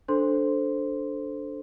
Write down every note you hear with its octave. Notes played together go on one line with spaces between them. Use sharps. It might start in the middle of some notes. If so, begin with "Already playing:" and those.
D4 A4 C5 C6